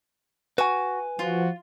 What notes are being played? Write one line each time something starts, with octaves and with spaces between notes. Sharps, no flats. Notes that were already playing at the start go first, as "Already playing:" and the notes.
F#4 B4 G#5
F3 F4 F#4